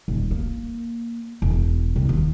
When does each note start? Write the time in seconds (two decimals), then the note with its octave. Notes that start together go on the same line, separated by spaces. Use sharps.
0.08 D#1
0.31 A#3
1.42 E1
1.96 C2
2.09 D#2